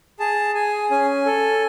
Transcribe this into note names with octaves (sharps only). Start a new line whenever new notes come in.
G#4 A5
G#4 G#5
C#4 G#5
A4